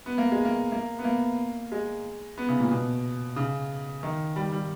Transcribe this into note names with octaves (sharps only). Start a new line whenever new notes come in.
B3
A#3
G#3
A#3
A#3
B3
A#3
G#3
B3
C#3
A#2
B2
C#3
D#3
G3
G3